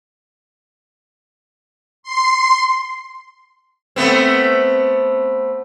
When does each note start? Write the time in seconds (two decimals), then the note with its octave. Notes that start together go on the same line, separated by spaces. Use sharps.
2.03 C6
3.96 A3 B3 C4